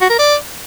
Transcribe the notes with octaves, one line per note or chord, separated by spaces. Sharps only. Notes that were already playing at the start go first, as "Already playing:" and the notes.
F#4
A#4
D5